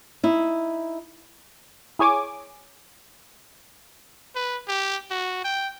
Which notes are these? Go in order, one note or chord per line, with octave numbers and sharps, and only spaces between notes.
D#4 E4
E4 G#4 C#5 G#5 D6
B4
G4
F#4
G5